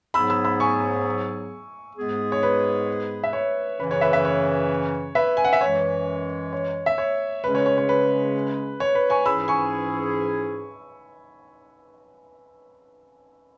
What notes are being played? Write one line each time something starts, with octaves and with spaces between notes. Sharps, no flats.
G#2 F#3 B3 G#4 B5 E6
B5 E6
B5 E6
G#5 C#6
G#2 G#3 B3 G#4
C#5
B4
E5
C#5
F#2 C#3 E3 C#4 B4
C#5
B4 E5
B4 E5
C#5
B4 E5
G#5
F#5
E5
F#2 E3 G#3 C#5
C#5
E5
C#5
C#3 G#3 C#4 G#4 B4
C#5
C#5
C#5
B4
C#5
B4
G#5 C#6
G#2 E3 C#4 E4 G#4 B5 E6
G#5 C#6